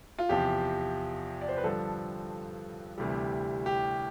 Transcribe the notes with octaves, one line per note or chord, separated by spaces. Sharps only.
F4
E2 C3 F3 G4
D5
C5
B4
G2 D3 F3 A4
D2 C3 E3 G3
G4